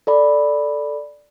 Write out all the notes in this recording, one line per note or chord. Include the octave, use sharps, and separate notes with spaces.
A4 D5 B5